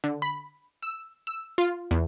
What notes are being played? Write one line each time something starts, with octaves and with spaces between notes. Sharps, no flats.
D3
B5
E6
E6
F4
E2